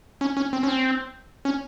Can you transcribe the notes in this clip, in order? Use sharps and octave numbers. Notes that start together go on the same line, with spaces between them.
C#4
C#4
C4
C#4
C4
C#4